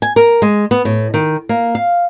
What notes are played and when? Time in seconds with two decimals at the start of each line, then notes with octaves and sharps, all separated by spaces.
0.02 G#5
0.16 A#4
0.42 G#3
0.71 B3
0.85 A2
1.14 D#3
1.49 A#3
1.75 F5